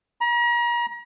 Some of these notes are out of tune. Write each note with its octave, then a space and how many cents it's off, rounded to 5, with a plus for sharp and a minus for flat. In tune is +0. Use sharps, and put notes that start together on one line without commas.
A#5 +40